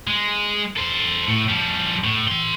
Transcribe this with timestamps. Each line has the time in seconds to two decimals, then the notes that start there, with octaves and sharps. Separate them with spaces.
0.07 G#3
0.76 A4 C5
1.28 A2
1.49 F3 G3
2.04 A2
2.28 A4 C6